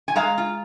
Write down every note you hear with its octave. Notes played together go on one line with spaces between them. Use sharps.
G#5
G#3 F5 A#5
F4